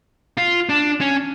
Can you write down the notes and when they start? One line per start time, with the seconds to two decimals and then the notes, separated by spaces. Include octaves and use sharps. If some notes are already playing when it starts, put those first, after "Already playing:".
0.38 F4
0.69 D4
1.01 C#4